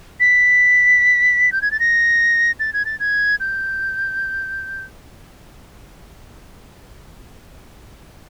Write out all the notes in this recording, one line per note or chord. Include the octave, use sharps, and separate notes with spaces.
B6
G6
G#6
A6
A#6
A6
G#6
A6
G#6
G6